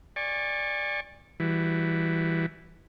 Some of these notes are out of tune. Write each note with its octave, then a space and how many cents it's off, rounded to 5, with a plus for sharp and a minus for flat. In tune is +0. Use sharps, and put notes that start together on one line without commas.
D5 +0 G#5 -35 C#6 -25
E3 +0 G3 +0 F#4 +20